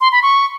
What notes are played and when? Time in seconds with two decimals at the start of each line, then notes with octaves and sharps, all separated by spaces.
0.01 C6
0.12 B5
0.23 C#6